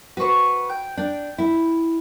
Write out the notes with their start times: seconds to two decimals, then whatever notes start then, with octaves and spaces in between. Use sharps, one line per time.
0.17 F#4 B4 C5 C#6
0.69 G5
0.97 D4 G5
1.38 E4